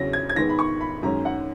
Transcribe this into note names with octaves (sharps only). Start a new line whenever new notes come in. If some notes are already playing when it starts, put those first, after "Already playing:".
Already playing: E2 C#3 F#3 C#4 A#6
G#6
G#6
G#2 D#3 G#3 B3 A#6
B5
C#6
B5
F#2 D#3 G#3 C#4 A#5
F#5